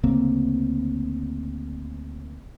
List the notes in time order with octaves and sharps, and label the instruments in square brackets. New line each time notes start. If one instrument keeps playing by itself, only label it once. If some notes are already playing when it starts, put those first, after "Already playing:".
[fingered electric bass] D2 C#3 A#3 C4